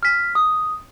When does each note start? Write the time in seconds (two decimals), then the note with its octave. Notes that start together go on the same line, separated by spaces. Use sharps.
0.03 F6 B6
0.35 D#6